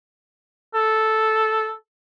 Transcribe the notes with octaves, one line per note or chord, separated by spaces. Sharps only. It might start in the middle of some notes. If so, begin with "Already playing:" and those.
A4